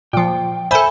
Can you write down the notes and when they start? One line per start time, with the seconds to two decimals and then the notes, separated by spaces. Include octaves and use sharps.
0.13 A#2 F3 G5
0.71 A4 C5 E5 G#5 B5